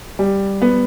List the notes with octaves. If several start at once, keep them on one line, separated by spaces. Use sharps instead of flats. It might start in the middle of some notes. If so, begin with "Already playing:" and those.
G3
B3